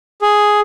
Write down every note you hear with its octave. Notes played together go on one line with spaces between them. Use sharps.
G#4